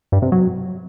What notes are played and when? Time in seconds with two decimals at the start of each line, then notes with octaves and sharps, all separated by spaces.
0.12 G2
0.22 C3
0.32 F#3